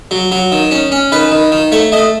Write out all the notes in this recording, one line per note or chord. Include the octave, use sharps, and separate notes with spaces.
F#3
F#3
D#3
C#4
C#4
D#3 B4
D#3
D#3
A3 C#5
A3 D#5